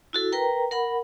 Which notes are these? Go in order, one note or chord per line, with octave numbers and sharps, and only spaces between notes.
E4 F#4 A4
A#4 B4 G5 A#5
A#4 F#5 B5